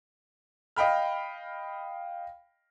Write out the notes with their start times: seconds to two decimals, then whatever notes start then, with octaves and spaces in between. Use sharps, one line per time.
0.76 D#5 F5 G5 B5 F6